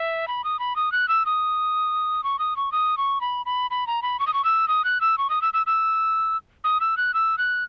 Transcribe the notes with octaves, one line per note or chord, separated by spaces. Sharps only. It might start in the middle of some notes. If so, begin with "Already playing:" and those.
Already playing: E5
B5
D#6
B5
D#6
F#6
E6
D#6
C#6
D#6
C#6
D#6
C#6
B5
B5
B5
A#5
B5
C#6
D#6
C#6
E6
D#6
F#6
E6
C#6
D#6
E6
E6
E6
D#6
E6
F#6
E6
F#6